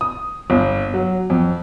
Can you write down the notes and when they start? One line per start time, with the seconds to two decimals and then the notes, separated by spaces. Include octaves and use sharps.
0.01 D#6
0.50 G1
0.94 F#3
1.30 F2